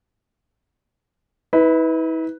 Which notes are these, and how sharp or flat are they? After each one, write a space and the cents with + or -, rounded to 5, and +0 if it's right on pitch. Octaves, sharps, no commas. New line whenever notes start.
E4 -40 B4 +0